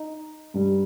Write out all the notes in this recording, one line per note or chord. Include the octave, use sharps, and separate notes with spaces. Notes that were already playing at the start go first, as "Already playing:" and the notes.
Already playing: D#4
G2 G3